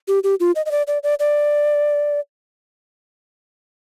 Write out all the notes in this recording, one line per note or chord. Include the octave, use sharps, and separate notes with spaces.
G4
G4
F4
D#5
D#5
D5
D5
D5
D5